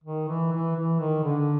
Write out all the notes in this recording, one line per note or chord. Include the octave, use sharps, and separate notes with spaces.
D#3
E3
E3
E3
D#3
D3